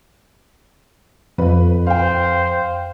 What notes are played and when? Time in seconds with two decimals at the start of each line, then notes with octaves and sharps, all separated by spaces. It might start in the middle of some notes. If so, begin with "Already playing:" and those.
1.38 F2 B4
1.87 C5 F5 G5